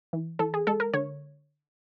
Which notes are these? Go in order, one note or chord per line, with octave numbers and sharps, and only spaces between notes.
E3
E3 A4
G#4
G#3 A4
A#4
D3 C#5